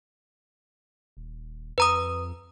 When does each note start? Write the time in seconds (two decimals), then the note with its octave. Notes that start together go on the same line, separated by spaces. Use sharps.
1.17 D#1
1.78 F2 B4 A#5 D#6